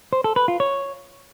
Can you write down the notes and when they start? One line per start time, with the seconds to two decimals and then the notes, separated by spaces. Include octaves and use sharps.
0.13 C5
0.24 A4
0.36 B4
0.48 F4
0.60 C#5